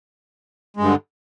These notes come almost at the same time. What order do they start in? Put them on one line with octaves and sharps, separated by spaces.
G#3 G2 D3